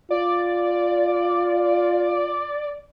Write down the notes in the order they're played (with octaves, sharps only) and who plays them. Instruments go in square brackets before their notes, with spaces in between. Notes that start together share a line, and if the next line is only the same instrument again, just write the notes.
[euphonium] F4 [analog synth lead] D5